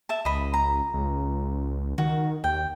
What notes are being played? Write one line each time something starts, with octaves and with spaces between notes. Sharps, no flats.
E5 A5
C#2 D#5 B5
A#5
C#2
D#3 F#4
D#2 G5